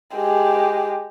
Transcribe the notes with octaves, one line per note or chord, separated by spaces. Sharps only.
G#3 G4